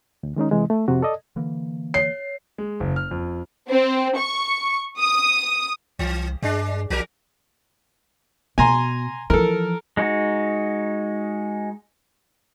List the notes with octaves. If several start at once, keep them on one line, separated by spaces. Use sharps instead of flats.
D2
D#3 G#3 C#4 D#4
C3 E3 G#3
A3
F2 C3 F#4
A4 D5 D#5
D3 E3 A#3
C#5 C7
G#3
F#1
F6
F2
C4
C#6
D#6
C2 E3
G2 G#3 D4
B1 F3 A#4
B2 G#5 A#5 C6
E3 F3 A4 A#4
G#3 D#4 F#4